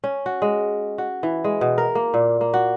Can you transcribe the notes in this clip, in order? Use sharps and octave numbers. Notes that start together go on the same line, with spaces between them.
C#4
F#4
G#3
F#4
E3
G#3
B2
A#4
A#3
A#2
A#3
F#4